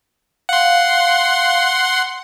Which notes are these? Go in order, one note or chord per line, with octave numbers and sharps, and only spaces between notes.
F5 F#5 C6